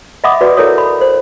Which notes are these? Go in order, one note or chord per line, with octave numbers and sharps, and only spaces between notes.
D#5 E5 F#5 B5 D6 D#6
F#4 B4 D5
E4 A4 A#4 C#5 D#6
B5
C5